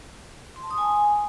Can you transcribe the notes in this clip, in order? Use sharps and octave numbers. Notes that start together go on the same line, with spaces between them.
C6
A5
D#6
G#5